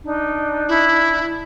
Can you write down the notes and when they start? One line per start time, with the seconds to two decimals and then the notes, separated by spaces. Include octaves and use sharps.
0.03 D4 D#4
0.69 E4